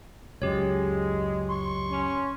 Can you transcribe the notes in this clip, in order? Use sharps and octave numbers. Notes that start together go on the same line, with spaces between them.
C#2 F#2 G#3 G4 C#5
C6 C#6
C#4